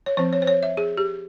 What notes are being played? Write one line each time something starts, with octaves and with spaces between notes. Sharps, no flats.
C#5
F3 C4 C5
C#5
C5
C#5
E5
G#4
G4